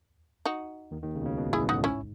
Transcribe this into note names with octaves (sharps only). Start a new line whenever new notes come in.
D#4 F#4
D#2 D#3
D#2 D#3
C#2 C#3
B2
C#2 C#3
B1 B2
A1 A2
E4 G#4
B1 B2
A1 A2 D#4 F#4
G#2 C#4 E4